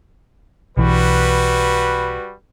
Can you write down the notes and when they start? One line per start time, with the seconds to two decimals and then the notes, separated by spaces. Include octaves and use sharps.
0.77 B1 E3 G3 F#4 B4